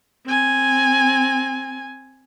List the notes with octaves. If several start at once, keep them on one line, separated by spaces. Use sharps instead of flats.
C4 G#5